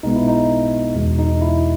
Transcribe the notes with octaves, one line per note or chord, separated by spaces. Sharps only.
B1 B2 G#3 B3 D#4
E4
D#4
E2 B2 G#3
D#4
E4